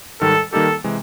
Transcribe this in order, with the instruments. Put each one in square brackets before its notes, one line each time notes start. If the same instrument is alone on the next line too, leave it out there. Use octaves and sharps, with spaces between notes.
[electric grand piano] G#2 D#3 G3 [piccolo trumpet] A4
[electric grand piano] D#3 G3 A#3 D#4 G4 [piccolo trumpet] A4
[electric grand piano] C3 E3 G#3